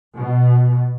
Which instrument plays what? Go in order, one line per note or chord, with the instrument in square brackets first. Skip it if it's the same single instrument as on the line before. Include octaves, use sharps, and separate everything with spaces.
[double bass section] B2